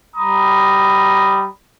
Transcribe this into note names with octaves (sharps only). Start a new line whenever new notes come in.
G3 A#5 B5 D#6